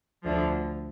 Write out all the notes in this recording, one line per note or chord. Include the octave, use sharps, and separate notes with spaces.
D2 D3 F3